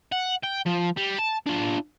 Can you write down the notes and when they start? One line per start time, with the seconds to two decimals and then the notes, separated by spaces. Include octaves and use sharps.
0.12 F#5
0.44 G5
0.66 F3
0.97 G3
1.19 A5
1.47 D4 F4